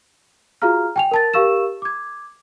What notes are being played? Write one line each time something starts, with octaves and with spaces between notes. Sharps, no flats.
F4 F#4 G#4 F5 A#5 F6
G5 G#5 F7
A#4 A5 A6
G4 A#4 F5 C#6 E6 E7
D6 G#6